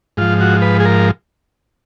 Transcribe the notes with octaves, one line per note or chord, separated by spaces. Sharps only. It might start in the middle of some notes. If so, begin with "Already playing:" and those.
G#2 F3 F4
F#4
B4
G#4
A#4